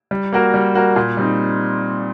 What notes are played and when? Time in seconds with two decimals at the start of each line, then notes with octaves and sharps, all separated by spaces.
0.11 G3
0.33 A#3 F#4 A#4
0.54 G3
0.74 A#3 F#4 A#4
0.96 A#2
1.17 G3 C4 D#4